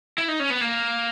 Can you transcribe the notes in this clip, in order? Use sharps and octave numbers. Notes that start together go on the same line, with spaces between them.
E4
D#4
C#4
B3
A#3